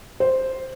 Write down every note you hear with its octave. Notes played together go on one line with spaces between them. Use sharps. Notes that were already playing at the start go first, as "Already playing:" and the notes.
C5